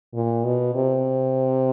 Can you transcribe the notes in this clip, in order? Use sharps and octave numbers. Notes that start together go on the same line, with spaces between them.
A#2
B2
C3